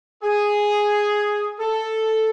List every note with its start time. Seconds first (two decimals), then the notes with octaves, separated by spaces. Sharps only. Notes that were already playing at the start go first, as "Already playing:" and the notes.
0.24 G#4
1.60 A4